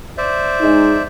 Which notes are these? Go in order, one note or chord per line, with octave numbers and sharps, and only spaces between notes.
C5 D5 E5
G#3 D#4